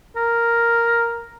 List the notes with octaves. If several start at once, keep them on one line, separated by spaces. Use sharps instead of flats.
A#4